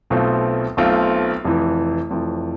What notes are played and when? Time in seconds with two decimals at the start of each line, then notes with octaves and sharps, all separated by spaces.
0.10 B1 B2 A3 C4 F4
0.77 B1 B2 A3 C4 F4
1.44 F1 F2 E3
2.10 F1 F2 E3